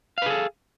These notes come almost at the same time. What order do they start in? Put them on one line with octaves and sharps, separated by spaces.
F5 B4 G#4 A4